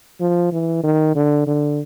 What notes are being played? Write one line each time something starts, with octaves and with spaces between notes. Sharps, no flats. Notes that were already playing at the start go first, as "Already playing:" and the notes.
F3
E3
D#3
D3
D3